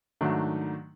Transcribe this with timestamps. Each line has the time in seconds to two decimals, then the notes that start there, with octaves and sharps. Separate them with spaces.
0.21 G#2 D#3 F#3 A3 D4